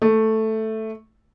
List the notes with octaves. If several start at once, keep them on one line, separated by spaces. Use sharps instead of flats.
A3